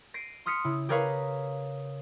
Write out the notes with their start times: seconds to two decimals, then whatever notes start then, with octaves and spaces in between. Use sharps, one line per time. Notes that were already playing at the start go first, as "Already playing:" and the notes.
0.14 A#6 C7 D7 D#7
0.46 C6 D#6 F6 B6 C#7
0.64 C#3 E4
0.89 G4 G#4 A#4 B4 C#5 F5